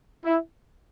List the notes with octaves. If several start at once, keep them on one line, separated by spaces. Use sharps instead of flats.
E4